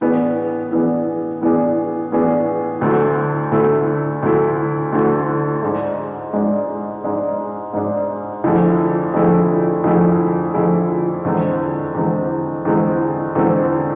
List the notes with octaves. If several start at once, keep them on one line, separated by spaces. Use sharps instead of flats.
A2 E3 B3 D4 G#4
A2 E3 B3 D4 G#4
A2 E3 B3 D4 G#4
A2 E3 B3 D4 G#4
D2 D3 A3 E4
D2 D3 A3 E4
D2 D3 A3 E4
D2 D3 A3 E4
G#2 G#3 D4
G#2 G#3 D4
G#2 G#3 D4
G#2 G#3 D4
F2 D3 A3 E4 G#4
F2 D3 A3 E4 G#4
F2 D3 A3 E4 G#4
F2 D3 A3 E4 G#4
E2 D3 G#3 C4
E2 D3 G#3 C4
E2 D3 G#3 C4
E2 D3 G#3 C4